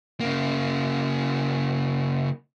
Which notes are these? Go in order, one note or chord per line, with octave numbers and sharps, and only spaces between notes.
C#3 A#3